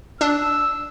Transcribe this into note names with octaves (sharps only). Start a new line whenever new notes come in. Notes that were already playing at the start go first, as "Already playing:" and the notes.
D4 E6